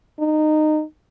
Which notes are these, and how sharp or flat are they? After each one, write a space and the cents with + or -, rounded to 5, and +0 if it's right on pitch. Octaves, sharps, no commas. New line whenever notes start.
D#4 -20